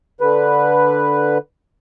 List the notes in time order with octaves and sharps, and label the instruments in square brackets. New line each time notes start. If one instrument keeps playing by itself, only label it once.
[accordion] D3 B4